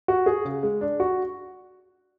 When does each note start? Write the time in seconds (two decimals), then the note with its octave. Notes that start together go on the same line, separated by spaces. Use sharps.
0.08 F#4
0.26 G#4
0.45 C#3
0.63 G#3
0.81 D4
1.00 F#4